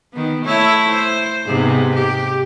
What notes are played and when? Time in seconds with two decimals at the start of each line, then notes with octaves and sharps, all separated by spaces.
0.13 D#3 B3
0.45 A3 E4 C#5
0.90 C5
1.46 G#2 C3 B3
1.94 G4